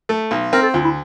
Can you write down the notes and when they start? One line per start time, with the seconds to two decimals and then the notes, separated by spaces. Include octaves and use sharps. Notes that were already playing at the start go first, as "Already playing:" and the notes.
0.09 A3
0.31 B1
0.53 C4 A#4
0.63 A4
0.74 D2 F4
0.84 E4